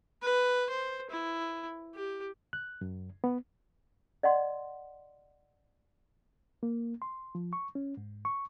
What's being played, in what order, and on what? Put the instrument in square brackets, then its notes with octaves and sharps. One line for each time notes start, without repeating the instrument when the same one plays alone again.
[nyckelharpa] B4
C5
E4
G4
[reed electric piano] F#6
F#2
B3
[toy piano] D5 D#5 F#5 C6
[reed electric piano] A#3
C6
F3
C#6
C#4
G#2
C#6